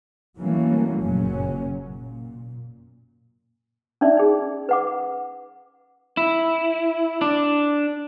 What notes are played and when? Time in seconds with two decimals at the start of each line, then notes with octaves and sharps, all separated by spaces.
0.38 E3 F#3 G3 A3 A#3 C#4
1.02 F#1 F#2 A#2 F#3 C#4
1.90 A#2
4.01 C#4 D#4 D5 E5
4.17 D#4 G#4
4.69 B4 F#5 D6
6.17 E4
7.21 D4